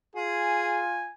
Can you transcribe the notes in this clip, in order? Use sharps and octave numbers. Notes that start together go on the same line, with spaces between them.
F4 G#4 G#5